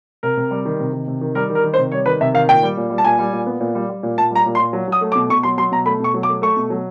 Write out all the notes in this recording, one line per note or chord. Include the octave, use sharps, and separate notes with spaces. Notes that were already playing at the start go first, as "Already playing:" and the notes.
C3 A#4
C3
G3
D#3
C3
D#3
C3
D#3
G3 A#4
D#3
A#4
D#3
C5
C3
G3 C#5
D#3 B4
C3 E5
D#3 F5
A#2 G5
G3
A#2
G3
A5
A#2 G#5
G3
A#2
B3
A#2
G3
G3
A#2
A#2 A5
G3 A#5
A#2
C6
A#2
F#3
F#3 D#6
A3
D6
B2
B2 C#6
F#3 C6
F#3 C6
B2 A#5
A3 B5
B2 C#6
F#3
D6
A3
A3 C#6
B2
F#3